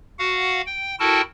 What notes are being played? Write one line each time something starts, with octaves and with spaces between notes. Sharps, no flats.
F#4 F5 F#5
G5
E4 F#4 A4 A#4 G5 A5